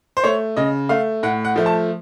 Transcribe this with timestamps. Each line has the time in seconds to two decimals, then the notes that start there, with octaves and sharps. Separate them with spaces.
0.17 C5
0.24 A3 C#5
0.56 C#3 D#5
0.89 A3 F5
1.23 A2 F#5
1.45 F#5
1.56 F3 A3
1.66 A5